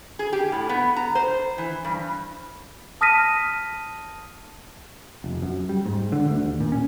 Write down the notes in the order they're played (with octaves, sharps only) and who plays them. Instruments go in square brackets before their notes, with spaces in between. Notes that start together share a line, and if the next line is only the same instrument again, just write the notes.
[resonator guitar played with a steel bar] G#4
G4
A2
B3
A#5
C5
E3
G2
[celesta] A5 D#6 F6 A#6 B6 D#7
[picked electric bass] F1
F#2
G3
G#2
D3
D2
D#2
A#2
C#4